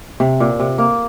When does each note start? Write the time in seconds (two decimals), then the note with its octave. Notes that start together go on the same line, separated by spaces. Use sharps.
0.20 C3
0.40 A#2
0.60 C3
0.78 A#3